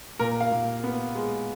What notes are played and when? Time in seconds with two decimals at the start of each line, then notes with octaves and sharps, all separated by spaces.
0.19 A#2 A#4
0.41 F5
0.51 A#2
0.84 B3
1.15 G#3